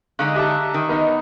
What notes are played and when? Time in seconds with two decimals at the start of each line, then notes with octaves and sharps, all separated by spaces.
0.19 D3 G#3 D#4 F5 C#6 F#6
0.36 G4 E5 A5 A#5 D6
0.74 D#3
0.89 B3 D#4 A#4 D#5